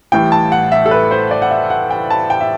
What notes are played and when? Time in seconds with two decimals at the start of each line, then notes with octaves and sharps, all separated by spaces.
0.12 A1 A2 E3 G3 G5
0.32 A5
0.52 F#5
0.72 E5
0.86 A4
0.91 B4
1.11 C5
1.31 D5
1.42 F#5
1.51 E5
1.70 F#5
1.91 G5
2.10 A5
2.30 G5
2.41 E5